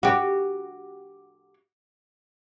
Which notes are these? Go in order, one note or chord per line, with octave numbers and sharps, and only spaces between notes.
F#4 G4